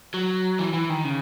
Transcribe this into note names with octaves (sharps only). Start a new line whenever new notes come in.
F#3
E3
E3
D#3
C#3